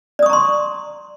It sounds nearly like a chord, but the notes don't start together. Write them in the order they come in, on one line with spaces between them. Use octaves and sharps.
D5 D#6 C#6 A#5 C6